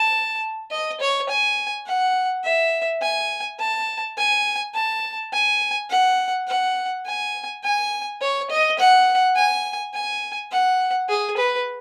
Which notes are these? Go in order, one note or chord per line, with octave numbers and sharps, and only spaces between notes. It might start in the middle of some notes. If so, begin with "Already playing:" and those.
Already playing: A5
D#5
C#5
G#5
F#5
E5
G#5
A5
G#5
A5
G#5
F#5
F#5
G#5
G#5
C#5
D#5
F#5
G#5
G#5
F#5
G#4
B4